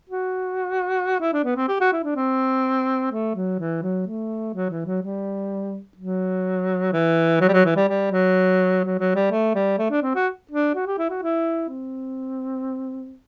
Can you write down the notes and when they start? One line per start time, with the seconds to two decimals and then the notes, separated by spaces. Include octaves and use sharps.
0.10 F#4
1.20 E4
1.33 D4
1.44 B3
1.56 C4
1.68 G4
1.80 F#4
1.93 E4
2.04 D4
2.16 C4
3.12 A3
3.35 F#3
3.59 E3
3.82 F#3
4.07 A3
4.54 F#3
4.70 E3
4.86 F#3
5.02 G3
5.97 F#3
6.93 E3
7.41 F#3
7.48 G3
7.53 F#3
7.65 E3
7.76 G3
7.89 G3
8.12 F#3
8.84 F#3
8.99 F#3
9.15 G3
9.31 A3
9.55 G3
9.78 A3
9.90 D4
10.02 C4
10.15 F#4
10.51 D4
10.75 F#4
10.87 G4
10.98 E4
11.10 F#4
11.23 E4
11.69 C4